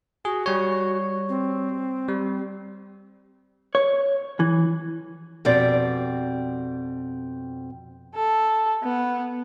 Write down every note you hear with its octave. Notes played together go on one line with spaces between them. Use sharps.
F#4 G#4
G3 C#5
C4
G3
C#5
E3
F2 B2 C4 G4 D5
A4
B3